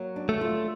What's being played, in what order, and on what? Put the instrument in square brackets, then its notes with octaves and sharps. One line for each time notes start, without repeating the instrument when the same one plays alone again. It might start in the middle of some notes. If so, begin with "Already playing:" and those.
Already playing: [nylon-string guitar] F#3 A#3
D4
[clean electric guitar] A3
[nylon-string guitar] F4